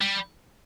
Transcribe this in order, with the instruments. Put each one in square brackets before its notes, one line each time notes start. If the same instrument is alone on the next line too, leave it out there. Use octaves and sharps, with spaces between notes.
[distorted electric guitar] G3